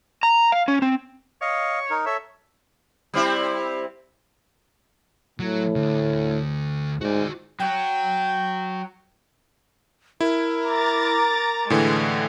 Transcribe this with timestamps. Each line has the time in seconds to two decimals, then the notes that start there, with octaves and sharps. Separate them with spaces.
0.23 A#5
0.52 F5
0.68 C#4
0.82 C4
1.42 C#5 D#5 F5
1.90 D#4 A#4
2.06 A4 C#5 E5
3.14 G3 C4 E4
5.40 A2 F#3
5.76 D2
7.01 G#2 F#4 D5
7.60 F#3 F#4 G5
10.21 E4 A#4
10.67 A#5 D6 A6
11.70 A2 D3 E3 G#3